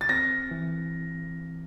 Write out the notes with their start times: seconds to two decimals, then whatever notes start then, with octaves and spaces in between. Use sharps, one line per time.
0.01 A6
0.09 C4 A#6
0.51 E3